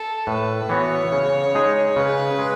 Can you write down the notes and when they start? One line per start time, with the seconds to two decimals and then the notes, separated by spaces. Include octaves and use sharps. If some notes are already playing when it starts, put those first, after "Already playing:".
Already playing: A4
0.27 A2 B4
0.69 E3 B3 F#4 C#5
1.12 C#3
1.55 G#3 D#4 G#4
1.96 C#3 B4
2.39 G#3